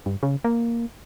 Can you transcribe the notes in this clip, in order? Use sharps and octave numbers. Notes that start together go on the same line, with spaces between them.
G2
C#3
A#3